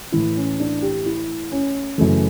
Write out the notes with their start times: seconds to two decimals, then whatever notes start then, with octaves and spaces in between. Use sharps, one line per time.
0.12 A2 E3 E4
0.37 C#4
0.60 D4
0.82 G4
1.06 E4
1.52 C#4
1.98 F#2 C#3 E3 A3